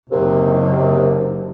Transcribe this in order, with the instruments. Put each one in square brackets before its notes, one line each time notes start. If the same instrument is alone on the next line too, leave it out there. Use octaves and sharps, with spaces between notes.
[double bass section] F#1 [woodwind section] D#2 C3